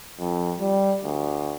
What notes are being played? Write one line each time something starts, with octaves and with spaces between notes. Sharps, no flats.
F2
G3
D2